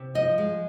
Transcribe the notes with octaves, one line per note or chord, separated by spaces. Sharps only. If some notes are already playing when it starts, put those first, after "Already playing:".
Already playing: C3
F3 D#5
G#3